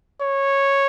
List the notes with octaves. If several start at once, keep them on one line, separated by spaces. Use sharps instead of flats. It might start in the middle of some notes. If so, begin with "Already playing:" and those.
C#5